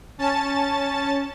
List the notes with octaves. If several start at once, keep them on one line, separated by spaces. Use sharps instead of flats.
C#4 A5 A6